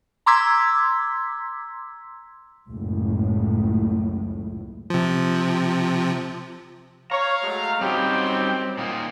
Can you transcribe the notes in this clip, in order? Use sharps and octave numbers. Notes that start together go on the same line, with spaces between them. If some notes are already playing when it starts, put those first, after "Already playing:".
A#5 C6 D6 E6 G#6 B6
F#1 C#2 A2
C3 F3
C#5 F5 A#5
F#3 G#3 A3
F#3 G3 C4 C#4 D#4 G4 G5
A#2 D#3 A#3